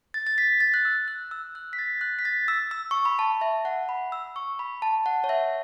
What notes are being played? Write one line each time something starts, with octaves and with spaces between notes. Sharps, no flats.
A6
A6
B6
A6
F#6
E6
F#6
E6
F#6
B6
A6
F#6
B6
A6
E6
E6
C#6
B5
A5
E5
F#5
B5
E6
C#6
B5
A5
F#5
C#5
E5